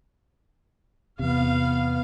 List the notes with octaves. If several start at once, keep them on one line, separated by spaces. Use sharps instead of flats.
E2 C3 B3 F5